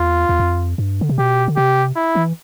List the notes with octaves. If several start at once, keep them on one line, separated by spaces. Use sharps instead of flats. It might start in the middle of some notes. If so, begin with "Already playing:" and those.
Already playing: E2 F4
E2
F2
G2
D3
C3
B2 G4
D3
C3 G4
E4
E3